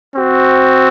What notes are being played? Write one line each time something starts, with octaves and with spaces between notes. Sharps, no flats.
C4 F#4